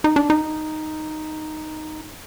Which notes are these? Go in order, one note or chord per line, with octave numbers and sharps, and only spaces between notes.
D#4
D4
D#4